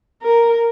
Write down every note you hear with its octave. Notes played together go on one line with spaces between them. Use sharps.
A#4